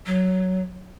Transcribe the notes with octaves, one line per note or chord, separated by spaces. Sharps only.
F#3